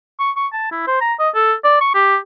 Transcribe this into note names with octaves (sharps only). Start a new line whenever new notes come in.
C#6
C#6
A5
E4
C5
A#5
D#5
A4
D5
C#6
G4